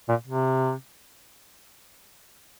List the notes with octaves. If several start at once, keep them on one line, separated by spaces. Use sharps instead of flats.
A#2
C3